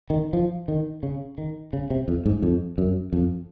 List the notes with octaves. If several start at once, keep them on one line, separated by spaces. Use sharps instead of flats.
D#3
F3
D#3
C#3
D#3
C#3
C3
F2
G#2
F2
F#2
F2